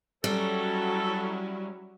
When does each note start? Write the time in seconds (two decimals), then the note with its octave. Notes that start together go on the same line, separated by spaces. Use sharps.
0.24 F#3 G3 C#4 E4 A4